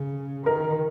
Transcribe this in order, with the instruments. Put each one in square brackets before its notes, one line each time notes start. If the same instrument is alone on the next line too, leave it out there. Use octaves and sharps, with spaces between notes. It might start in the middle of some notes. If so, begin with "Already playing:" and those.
Already playing: [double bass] C#3
[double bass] D#3 [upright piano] A#4